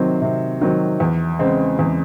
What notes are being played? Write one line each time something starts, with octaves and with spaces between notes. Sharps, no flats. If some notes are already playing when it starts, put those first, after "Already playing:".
Already playing: C3 D#3 F#3 C4
C3
D#3 F#3 C4
E2
C#3 G#3 C4
E2